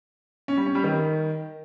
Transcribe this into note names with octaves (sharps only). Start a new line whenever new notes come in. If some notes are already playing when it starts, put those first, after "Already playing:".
C#4
G3
C#4
G3
D#3